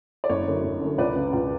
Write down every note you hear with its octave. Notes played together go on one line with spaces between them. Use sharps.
D5
F#1 C#5
F#2 D3
F#1
F#2 D3
C#2 B4 D5
C#3
C#2